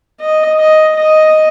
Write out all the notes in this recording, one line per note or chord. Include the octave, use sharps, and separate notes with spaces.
D#5
D#5
D#5